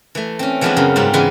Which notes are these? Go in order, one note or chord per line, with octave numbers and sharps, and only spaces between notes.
E3 A3
C4 C#4
E3 F3 G#3 B3 C4 D4
F#2 C#3 F#3 F5
G#2 G3 C4 F4
C#3 E3 G#3 B3